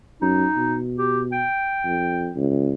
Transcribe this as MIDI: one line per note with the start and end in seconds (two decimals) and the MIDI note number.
0.21 0.46 42
0.21 0.80 63
0.56 1.45 47
0.98 1.21 67
1.32 2.34 79
1.85 2.31 41
2.36 2.73 37